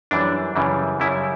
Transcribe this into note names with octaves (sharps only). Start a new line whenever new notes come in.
F#2 E3 G3 D4
F#2 C#3 E3 G3
F#2 C#3 G3 E4